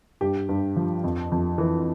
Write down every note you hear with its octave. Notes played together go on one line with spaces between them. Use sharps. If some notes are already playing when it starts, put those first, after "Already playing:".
G2 G4
G2
F3
F2
F2
E3